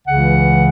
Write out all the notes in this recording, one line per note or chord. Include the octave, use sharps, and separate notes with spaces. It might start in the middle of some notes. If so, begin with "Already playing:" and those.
C#2 C#3 E3 F#5